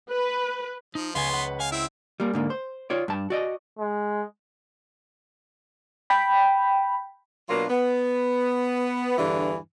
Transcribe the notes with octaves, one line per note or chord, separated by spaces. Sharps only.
B4
F3 D#4
C#2 B3 F5 G#5 C6
B4 F#5
F5 G#5
C4 E4 E5
G3 A#3
G#2 D3 A#3
C5
F4 C#5 D5
G2 A5
F#4 D5 D#5
G#3
G5 B5
B2 F#3 A#3 D4 F4
B3
E2 G2 D3 E3